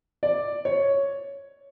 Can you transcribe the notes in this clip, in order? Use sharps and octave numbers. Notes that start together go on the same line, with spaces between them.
D5
C#5